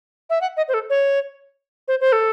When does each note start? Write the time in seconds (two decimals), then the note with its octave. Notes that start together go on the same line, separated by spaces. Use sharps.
0.30 E5
0.41 F#5
0.57 D#5
0.68 C5
0.74 A4
0.90 C#5
1.88 C5
2.01 C5
2.12 A4